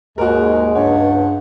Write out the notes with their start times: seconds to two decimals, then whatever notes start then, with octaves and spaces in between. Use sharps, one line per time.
0.18 D#2 G#2 G#3 F#4 A#4
0.75 C#2 G2 C#5 F#5